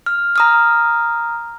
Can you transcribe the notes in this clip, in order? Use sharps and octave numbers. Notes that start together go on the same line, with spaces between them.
F6
A#5 D#6 F6